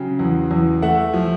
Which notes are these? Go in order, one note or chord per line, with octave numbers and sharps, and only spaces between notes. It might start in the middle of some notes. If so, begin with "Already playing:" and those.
Already playing: C#3 F#3 G5
E2
E2
A3 E5 F#5
F3